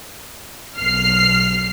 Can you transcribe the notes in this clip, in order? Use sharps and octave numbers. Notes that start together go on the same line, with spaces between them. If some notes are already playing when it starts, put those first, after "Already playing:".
B1 F6 C7